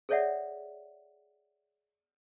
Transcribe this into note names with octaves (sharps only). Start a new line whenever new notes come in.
G#4 A4 C#5 D5 E5 F#5